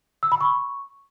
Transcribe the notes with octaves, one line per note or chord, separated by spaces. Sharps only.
E6
B5
C#6